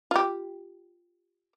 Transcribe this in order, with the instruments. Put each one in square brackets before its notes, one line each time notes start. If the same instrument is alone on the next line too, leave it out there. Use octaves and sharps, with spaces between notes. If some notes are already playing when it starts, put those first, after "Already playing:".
[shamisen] F4 G4